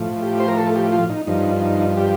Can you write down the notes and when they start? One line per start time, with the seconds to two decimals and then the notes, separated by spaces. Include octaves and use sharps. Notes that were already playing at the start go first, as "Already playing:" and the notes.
Already playing: A2 F3
0.22 G4
0.40 C5
0.48 A#4
0.58 A4
0.76 G4
0.92 F4
1.09 D#4
1.27 G2 F3 D#4
1.62 D#4
1.97 G4